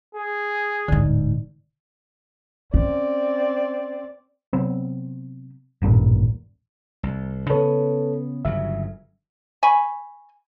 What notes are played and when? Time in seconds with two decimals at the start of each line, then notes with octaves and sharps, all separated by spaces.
0.15 G#4
0.88 D1 G#2 D3
2.74 C4 C#4 D5
4.53 C3 F#3 B3 C4
5.82 D#1 A1 G2 A#2
7.03 C2
7.50 C#3 B3 A4 B4 C#5
8.45 G1 C#3 F#3 E5
9.63 G#5 B5 C#6